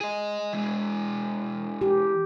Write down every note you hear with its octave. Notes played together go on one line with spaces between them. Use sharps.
G#4 D#5
E2 G#3
G4